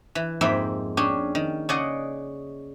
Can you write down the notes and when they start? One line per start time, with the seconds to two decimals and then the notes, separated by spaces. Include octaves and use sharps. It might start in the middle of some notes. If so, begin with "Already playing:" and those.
0.15 E3
0.41 F2 G#2 A#3 E5 G5 B5
0.97 C#4 D4 G4 G#4
1.35 D#3
1.69 C#3 G#4 D5 D#5 F#5